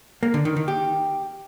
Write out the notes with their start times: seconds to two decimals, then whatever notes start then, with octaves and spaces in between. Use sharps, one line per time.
0.23 A#3
0.34 D3
0.45 D#3
0.57 D#3
0.68 G4